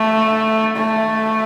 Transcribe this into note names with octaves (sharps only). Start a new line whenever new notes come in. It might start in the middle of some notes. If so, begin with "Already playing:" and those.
Already playing: A3
A3